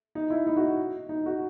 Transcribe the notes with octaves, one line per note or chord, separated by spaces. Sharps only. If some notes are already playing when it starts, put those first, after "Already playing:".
D#4
E4
D#4
F#4
D#4
F#4